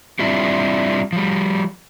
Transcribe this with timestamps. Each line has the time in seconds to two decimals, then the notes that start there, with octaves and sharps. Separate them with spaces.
0.19 G3 C4 D4 E4 F4 G4
1.13 F3 G3